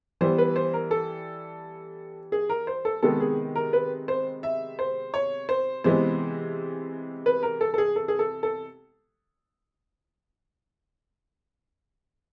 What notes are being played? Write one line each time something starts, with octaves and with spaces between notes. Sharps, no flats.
E3 G3 B3 C5
B4
C5
A#4
A4
G#4
A#4
C5
A4
C3 D#3 G#3 B3 A4
G#4
A#4
B4
C5
E5
C5
C#5
C5
C3 E3 G#3 B3 C5
B4
A#4
A4
A4
G#4
A4
G#4
A4
A4